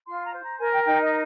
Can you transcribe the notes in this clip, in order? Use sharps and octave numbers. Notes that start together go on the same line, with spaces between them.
F4 C6
A#5
C5
A#5
A#4 G#5
G5
G#5
D#4 G5
D#5